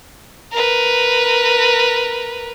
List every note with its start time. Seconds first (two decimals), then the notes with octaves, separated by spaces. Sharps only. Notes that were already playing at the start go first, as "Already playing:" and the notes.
0.52 A#4 B4